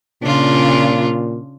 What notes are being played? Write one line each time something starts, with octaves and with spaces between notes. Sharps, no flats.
A#2 C#3 D4 F4